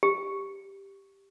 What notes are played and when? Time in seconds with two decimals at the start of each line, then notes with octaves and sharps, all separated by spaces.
0.03 G4